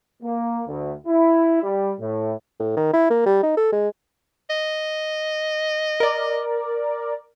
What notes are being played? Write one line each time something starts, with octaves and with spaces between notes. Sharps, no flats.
A#3
D2
E4
G3
A2
A2
D#3
E4
A#3
G3
D#4
A4
G#3
D#5
A#4 D5